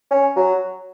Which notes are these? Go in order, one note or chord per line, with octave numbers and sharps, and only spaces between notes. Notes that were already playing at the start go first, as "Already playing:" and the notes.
C#4
F#3